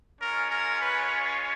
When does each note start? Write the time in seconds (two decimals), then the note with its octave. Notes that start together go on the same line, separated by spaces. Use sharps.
0.20 G#3 C#4 F4 A#4
0.51 A#4
0.81 B4